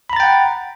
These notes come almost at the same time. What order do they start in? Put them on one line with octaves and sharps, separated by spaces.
B5 A#5 A6 G5 F#5